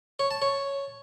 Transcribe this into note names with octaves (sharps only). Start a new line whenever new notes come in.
C#5
A5
C#5